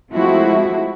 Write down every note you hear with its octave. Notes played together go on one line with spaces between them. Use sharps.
F3 G#3 A3 C4 E4 F#4